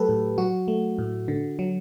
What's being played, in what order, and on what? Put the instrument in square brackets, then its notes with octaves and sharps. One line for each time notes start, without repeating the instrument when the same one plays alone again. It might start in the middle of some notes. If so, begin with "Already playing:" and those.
Already playing: [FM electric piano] F#3 A3 G4 A4 B4
A2
F#3 F#4
A3
A2
D3
F#3